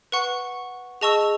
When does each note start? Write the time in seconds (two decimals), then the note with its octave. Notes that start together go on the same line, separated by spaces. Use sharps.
0.12 B4 F#5 C#6
1.01 G#4 D#5 A5 C#6 E6